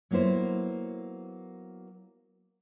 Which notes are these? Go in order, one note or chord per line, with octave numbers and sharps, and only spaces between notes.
F#3 A#3 B3 E4 C5